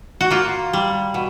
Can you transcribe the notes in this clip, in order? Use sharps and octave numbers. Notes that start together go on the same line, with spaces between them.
F#4
A#3 F4
G3
B2